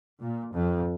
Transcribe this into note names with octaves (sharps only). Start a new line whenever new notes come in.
A#2
F2